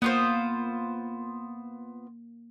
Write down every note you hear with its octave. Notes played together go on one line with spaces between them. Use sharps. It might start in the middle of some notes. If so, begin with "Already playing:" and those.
A#3 B3 F4 C5